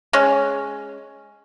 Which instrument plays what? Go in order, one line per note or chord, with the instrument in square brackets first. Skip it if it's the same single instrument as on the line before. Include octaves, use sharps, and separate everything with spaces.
[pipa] G#3 C#4